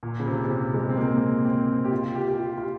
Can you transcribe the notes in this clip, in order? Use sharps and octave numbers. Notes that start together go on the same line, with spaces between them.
A#2
C#3
C3
C3
C#3
G#3
C4
A#3
C4
G4
F4
G4
G4
F4
F4
G4